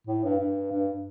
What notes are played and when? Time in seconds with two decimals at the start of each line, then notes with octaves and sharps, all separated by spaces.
0.07 A2
0.24 G2
0.39 G2
0.72 G2